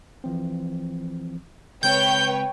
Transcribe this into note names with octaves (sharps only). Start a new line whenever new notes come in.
E3 F3 C4
C#3 G#3 C4 B4 C#5 G5 G6